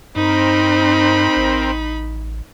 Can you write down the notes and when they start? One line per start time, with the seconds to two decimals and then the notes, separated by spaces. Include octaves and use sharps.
0.16 G2 C4 D#4 A#4 C5 B5
1.37 A1